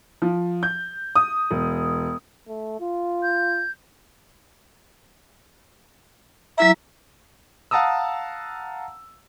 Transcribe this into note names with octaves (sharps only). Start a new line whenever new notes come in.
F3
G6
D#6
E1
A3
F4
G6
F#3 E4 E5 A#5
F5 F#5 A5 A#5 D#6 E6